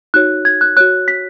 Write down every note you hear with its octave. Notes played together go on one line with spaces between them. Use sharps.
D#4 F#4 C#5 F#6
G#6
F#6
F#4 C#5 F#6
B6